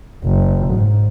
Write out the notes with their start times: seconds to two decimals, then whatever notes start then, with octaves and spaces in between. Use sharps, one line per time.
0.24 F#1
0.74 G#2